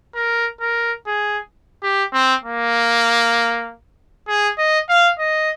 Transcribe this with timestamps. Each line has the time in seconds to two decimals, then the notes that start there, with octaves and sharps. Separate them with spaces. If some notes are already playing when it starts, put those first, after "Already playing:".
0.15 A#4
0.61 A#4
1.07 G#4
1.83 G4
2.13 C4
2.44 A#3
4.28 G#4
4.58 D#5
4.89 F5
5.19 D#5